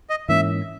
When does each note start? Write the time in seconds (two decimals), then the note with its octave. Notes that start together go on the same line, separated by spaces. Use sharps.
0.10 D#5
0.29 G#2 E3 A#3 C#4 E5